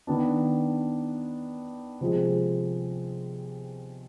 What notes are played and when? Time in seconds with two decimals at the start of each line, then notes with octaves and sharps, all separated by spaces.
0.07 D#3 B3 D4
2.01 C3 F3 G#3